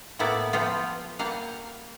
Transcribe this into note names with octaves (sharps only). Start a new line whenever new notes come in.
A2 A#3 B3 E4 D5
F3 G3 B3 F4
G3 A#3 F5 F#5